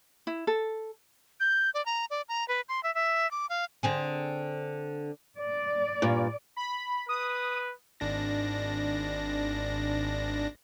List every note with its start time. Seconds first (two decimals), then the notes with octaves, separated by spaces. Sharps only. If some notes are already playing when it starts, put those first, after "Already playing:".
0.27 E4
0.47 A4
1.40 G6
1.74 D5
1.86 A#5
2.10 D5
2.29 A#5
2.48 B4
2.69 C6
2.83 E5
2.95 E5
3.31 D6
3.50 F5
3.83 D3 C4 G#4
5.38 D5
6.02 G2 A#2
6.56 B5
7.09 B4 D#6
8.00 G#1 D4 A#6